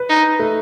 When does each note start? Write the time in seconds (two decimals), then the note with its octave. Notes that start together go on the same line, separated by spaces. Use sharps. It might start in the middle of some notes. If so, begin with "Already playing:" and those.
Already playing: B4
0.09 D#4
0.39 A3